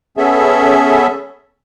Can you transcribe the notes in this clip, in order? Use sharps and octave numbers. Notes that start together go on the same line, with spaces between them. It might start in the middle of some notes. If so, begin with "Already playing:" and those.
B3 C#4 G#4 A4 E5